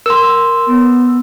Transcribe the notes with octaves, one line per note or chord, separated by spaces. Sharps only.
A#4 C6 E6
B3